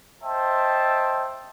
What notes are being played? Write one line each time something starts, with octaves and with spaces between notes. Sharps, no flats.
C5 D#5 E5 G5 A5